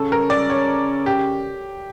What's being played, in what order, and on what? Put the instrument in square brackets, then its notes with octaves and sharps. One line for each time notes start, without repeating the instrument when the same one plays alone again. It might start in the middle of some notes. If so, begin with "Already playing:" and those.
Already playing: [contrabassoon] C#3 [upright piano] A4
[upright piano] A#4
D5
C#5
G4